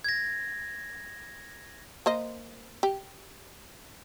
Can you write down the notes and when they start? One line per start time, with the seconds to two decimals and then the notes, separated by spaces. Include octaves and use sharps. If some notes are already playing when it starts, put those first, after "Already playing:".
0.04 G#6 A#6
2.06 A#3 C5 D#5
2.83 G4